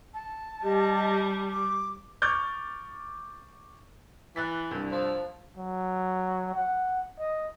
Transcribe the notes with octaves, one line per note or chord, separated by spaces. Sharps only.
A5
G3 G4 D#5
D6
C#6 D6 F6 G6 A6
E3 F#6 A6 B6
C2 G2
F3
F#3
F#5
D#5